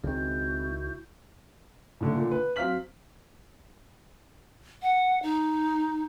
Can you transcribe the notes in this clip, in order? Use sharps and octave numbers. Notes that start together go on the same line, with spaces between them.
C#2 D#3 G#3 C4 E4 F#4 G6
A2 D3
A#2 D3
B4
F#3 C4 F5 F6 B6 F#7
F#5
D#4